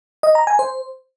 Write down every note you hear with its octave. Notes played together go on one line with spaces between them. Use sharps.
D#5
A#5
G#5
C5